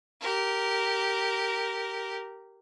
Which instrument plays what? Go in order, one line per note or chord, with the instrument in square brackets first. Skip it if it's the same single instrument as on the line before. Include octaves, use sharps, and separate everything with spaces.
[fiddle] G4 A#4